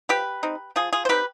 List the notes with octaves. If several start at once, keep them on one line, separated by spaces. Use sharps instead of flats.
F3 G4 B4
C4 D#4
F3 F4 G#4
F4 G#4
C5
C4 D#4 G4 B4